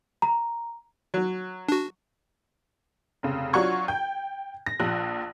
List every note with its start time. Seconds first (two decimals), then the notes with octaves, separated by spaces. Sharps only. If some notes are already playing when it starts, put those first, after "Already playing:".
0.22 A#5
1.14 F#3
1.69 D4 F#4
3.23 F1 C#3
3.53 F#3 D4 F4 F#5 C#6 G#6
3.88 G5 G6
4.66 A#6
4.80 A#1 F3 F#6